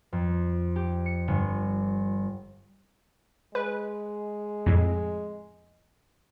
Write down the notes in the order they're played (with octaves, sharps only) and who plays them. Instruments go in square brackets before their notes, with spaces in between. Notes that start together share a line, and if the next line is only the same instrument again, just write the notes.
[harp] F2
G4
C#7
G1
[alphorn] G#3 [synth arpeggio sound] B4
[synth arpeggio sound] F2 A2